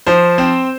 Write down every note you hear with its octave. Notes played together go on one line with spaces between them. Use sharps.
F3 C5
C4